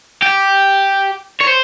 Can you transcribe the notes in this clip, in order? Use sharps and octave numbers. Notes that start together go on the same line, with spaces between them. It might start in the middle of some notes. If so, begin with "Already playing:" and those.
G4
C#5
C5